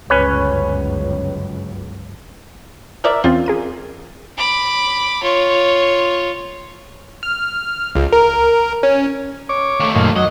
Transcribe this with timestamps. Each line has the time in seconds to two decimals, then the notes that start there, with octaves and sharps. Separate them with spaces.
0.10 G1 C#2 F#2 C#4 B4 C#5
3.04 A#4 D5 E5
3.24 E2 C4 C#4 F4
3.46 G#4 A#4 D#7
4.37 B5 D6
5.23 F4 C#5
7.23 F6
7.95 C#2
8.13 A#4
8.83 C#4
9.49 C#5 D6
9.80 D#2 A3
9.95 F#2 A#2 D#3
10.16 F#3 D#5